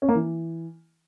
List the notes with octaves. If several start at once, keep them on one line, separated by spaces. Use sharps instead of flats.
C#4
A#3
E3